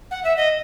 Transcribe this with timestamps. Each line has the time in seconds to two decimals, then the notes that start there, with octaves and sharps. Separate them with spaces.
0.11 F#5
0.24 E5
0.37 D#5